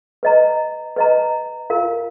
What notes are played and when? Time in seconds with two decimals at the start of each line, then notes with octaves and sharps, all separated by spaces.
0.23 B4 D#5 A#5
0.96 B4 D#5 A#5
1.70 F4 A#4 F5